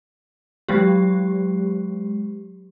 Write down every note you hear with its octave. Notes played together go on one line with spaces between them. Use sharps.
F#3 G#3 G4